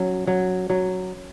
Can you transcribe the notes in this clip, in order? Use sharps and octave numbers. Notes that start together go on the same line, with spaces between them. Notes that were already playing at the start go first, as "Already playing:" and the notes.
Already playing: F#3 C#4
F#3
F#3